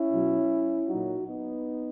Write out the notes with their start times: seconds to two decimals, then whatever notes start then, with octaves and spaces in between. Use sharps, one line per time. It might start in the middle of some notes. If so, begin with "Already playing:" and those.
Already playing: C#4 E4
0.11 B2 F#3
0.88 A#2 F#3 D#4 F#4
1.27 B3 D#4